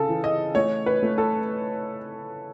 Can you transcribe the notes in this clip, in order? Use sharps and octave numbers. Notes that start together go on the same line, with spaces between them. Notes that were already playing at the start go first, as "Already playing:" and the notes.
Already playing: C#3 A4
E3
D#5
A3 C#5
B4
A3
A4